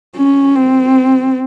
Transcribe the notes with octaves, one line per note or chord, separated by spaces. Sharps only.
C#4
C4